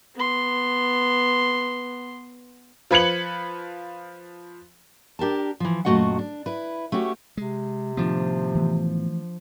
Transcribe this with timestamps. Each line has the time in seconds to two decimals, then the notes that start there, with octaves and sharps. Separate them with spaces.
0.15 B3 C6
2.91 F3 B4 G#6 C#7 F#7
5.19 D4 G4 A#4 A5
5.60 E3 F3
5.85 F#2 A#2 A3 F#4 D#5 F#5
6.19 D4
6.46 E4 B4
6.92 A3 C#4 F#4 G4
7.37 C3 G#3
7.97 A2 D#3 F3 B3 D4
8.55 E3 A3